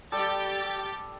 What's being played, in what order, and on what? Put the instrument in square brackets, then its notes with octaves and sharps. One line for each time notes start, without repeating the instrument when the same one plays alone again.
[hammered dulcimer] G3 A4 [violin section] G4 G5 A6